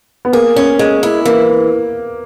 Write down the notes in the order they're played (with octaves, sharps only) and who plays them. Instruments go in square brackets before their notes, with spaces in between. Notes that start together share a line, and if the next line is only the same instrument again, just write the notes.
[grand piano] B3
[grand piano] A#3 [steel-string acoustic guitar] G#4
[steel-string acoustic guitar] C#4
G#3
E4
[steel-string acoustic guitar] E3 [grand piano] A#3